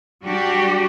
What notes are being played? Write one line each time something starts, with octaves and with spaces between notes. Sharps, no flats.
G3 D4 F#4 G4